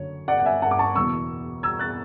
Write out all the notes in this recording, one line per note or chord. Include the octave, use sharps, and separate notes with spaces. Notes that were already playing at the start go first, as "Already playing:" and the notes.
Already playing: F#1 F#2 D3 C#5
D5 F#5
F#5
E5 G#5
F#5 A5
D6
A5 C#6
F#1 E2 B2 C#6 E6
E6 G#6
F#6 A6